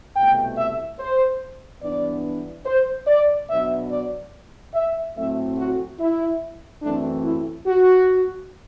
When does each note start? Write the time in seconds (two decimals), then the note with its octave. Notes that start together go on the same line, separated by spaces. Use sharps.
0.16 C2 B2 A3 G5
0.57 E5
0.99 C5
1.82 G2 E3 B3 D4 D5
2.66 C5
3.07 D5
3.49 B2 F#3 B3 D4 E5
3.91 D5
4.74 E5
5.16 A2 F#3 A3 C4 E5
5.58 F#4
5.99 E4
6.82 F#2 E3 A3 C4 D4
7.24 E4
7.66 F#4